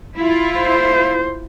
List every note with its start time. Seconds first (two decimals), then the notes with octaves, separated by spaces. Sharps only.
0.16 E4 F4
0.59 C5